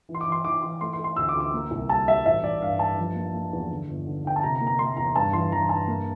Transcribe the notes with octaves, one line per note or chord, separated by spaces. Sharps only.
E3
C6
D6
E3
C6
E3 D6
E3 C6
A3 C6
C6
A3
C6
D2 E6
D6
D2
D6
A#3
C2
G3 A5
G3 E5
A1 E5
A1 D5
G2 F5
G2 A5
F3
A#3
A#3
E2
D3
G1
D3
D3 G5
A5
C3 A#5
A#5
A#3
A#5
A#3 C6
E2 A#5
G2 A5
E3 C6
E3 A#5
G2 A5
A#3